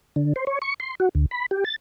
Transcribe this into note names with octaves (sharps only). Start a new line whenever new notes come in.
D3
C5
C#5
C#6
C6
F#4
D2
B5
G4
A6